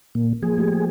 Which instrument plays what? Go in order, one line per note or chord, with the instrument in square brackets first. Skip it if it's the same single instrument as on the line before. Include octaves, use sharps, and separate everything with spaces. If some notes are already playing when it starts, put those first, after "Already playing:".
[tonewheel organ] A#2
[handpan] F3 A#3 [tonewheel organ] G#4
[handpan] A3 G4